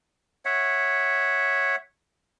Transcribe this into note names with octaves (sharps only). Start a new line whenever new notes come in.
C#5 E5 F#5